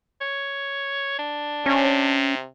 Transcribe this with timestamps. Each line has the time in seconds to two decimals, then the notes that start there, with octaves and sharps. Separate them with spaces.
0.21 C#5
1.19 D4
1.66 C3 C#4